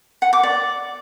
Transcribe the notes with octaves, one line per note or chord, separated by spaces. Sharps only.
F#5
D6
D5